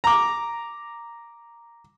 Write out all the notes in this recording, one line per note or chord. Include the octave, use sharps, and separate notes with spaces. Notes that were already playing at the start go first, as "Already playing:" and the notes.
A#5 D6